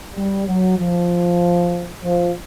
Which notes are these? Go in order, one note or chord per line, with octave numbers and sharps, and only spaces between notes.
G3
F#3
F3
F3